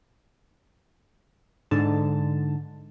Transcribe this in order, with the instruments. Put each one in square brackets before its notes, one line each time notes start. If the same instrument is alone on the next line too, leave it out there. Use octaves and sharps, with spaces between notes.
[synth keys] G#2 D3 A5